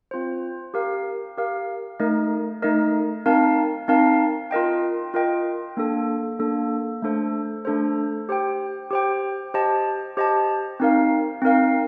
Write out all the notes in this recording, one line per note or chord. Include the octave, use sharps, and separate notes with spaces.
C4 F4 C5
G4 A#4 F5
G4 A#4 F5
A3 D#4 A#4 D#5
A3 D#4 A#4 D#5
C4 D#4 A#4 F5 A5
C4 D#4 A#4 F5 A5
F4 A#4 D#5 G5
F4 A#4 D#5 G5
A#3 D4 A4
A#3 D4 A4
A3 D4 A4 C5
A3 D4 A4 C5
G4 C5 G5
G4 C5 G5
G4 C5 D#5 A5
G4 C5 D#5 A5
C4 D#4 A#4 F5
C4 D#4 A#4 F5